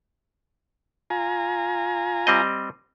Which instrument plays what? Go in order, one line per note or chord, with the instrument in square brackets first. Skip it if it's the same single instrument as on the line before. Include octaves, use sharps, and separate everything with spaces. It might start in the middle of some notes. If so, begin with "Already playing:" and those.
[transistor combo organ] F4 G#5 A#5
[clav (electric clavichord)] G3 C4 D#5